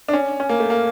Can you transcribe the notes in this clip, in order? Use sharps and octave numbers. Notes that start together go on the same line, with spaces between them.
D4
C#4
C#4
A#3
A3
A#3